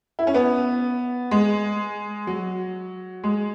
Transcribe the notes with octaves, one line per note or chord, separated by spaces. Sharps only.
E4
C#4
B3
G#3
F#3
G#3